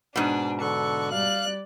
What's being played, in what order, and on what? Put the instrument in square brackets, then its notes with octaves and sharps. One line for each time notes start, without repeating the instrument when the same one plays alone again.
[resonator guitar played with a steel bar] G#2 B2 [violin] D4
[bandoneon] D3 A4 F#6 [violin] C#6
[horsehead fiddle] G3 D5 [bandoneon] F5 [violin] F#6